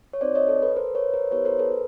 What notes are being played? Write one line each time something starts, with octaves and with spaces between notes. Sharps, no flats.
C#5
C4 D#4 F#4 C5 D5
C#5 D#5
A4
A4 B4
A#4 C5
B4 C#5
A#4 C5
B3 E4 G4 B4 C#5
A#4 C5
A4 B4